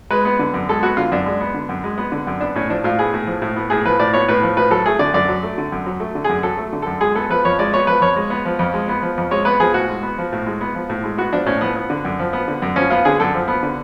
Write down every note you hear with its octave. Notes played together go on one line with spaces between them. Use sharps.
G#3 B4
B3
D3
F#2
G#3 A4
B3 F#4
D3 F4
F#2 D4
G#3
B3
D3
F#2
G#3
B3
D3
F#2
B3 D4
A2 C#4
F3 D4
A2 F4
B3 G#4
A2
F3
A2
B3
A2 G#4
F3 B4
A2 D5
B3 C#5
A2 B4
F3
A2 B4
F#3 A4
A3 G#4
D3 D5
F#2 D5
F#3
A3
D3
F#2
F#3
A3
D3
F#2 G#4
F#3 A4
A3
D3
F#2 A4
G#3 G#4
B3 A4
F3 B4
F2 C#5
G#3 D5
B3 C#5
F3 B4
F2 C#5
G#3
B3
F3
F2
G#3
B3
F3
F2
G#3 C#5
B3 B4
F3 G#4
A2 F#4
G#3
B3
F3
A2
G#3
B3
F3
A2
G#3
B3 F#4
F3 D4
A2 C#4
F3 B3
B3
D3
F#2
F3
B3
D3
F#2
F3 C#4
B3 F4
D3 G#4
F#2 A4
F3
B3
D3